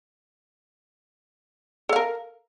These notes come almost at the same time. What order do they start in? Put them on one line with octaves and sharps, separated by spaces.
A4 F5 A#4